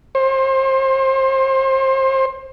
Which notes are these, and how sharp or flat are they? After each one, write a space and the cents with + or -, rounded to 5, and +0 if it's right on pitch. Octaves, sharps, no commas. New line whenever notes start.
C5 +30